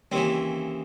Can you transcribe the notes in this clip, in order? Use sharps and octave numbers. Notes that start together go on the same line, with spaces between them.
D#2 C#3 E3 C4